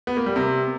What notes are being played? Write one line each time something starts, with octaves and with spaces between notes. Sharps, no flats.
B3
A#3
G3
C3